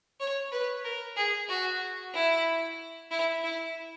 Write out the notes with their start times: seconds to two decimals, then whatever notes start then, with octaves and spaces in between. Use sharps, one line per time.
0.20 C#5
0.52 B4
0.85 A#4
1.17 G#4
1.49 F#4
2.14 E4
3.11 E4
3.44 E4